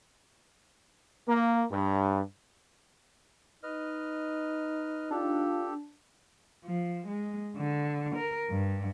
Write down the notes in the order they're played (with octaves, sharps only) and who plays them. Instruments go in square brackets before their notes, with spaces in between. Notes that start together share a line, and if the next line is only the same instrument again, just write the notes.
[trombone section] A#3
G2
[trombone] D#4 [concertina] B4 D#5 F6
[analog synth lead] D4 [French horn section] F4 [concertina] G4 A4
[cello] F3
G#3
D3
A#4
G2